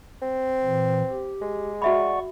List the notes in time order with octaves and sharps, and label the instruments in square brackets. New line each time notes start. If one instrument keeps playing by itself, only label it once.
[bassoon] C4
[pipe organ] A#2 E3
G4
[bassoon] G#3
[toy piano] F#4 E5 B5 [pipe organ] D5 F#5 C#6